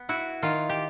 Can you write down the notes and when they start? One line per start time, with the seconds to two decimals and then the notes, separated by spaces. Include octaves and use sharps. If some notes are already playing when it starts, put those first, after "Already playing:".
Already playing: B3
0.09 E4 F#4
0.42 D#3 F4
0.69 G4